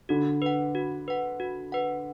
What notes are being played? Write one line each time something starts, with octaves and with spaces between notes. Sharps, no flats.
D3 F#4
B4 F#5
F#4
B4 F#5
F#4
B4 F#5